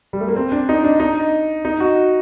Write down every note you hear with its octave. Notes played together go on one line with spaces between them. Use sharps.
G3
A3
A#3
C4
D4
D#4
D4
D#4
D#4
F#4